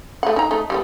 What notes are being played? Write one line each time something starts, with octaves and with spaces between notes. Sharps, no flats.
A3 F#5
D#4 A#5
A3 D#4
G3 G#3 B3